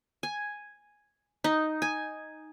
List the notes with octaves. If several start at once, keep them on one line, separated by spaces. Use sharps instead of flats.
G#5
D#4
G#5